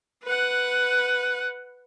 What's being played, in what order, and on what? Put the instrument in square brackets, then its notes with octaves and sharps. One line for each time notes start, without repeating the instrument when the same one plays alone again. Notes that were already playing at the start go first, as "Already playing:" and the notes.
[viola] B4 F#5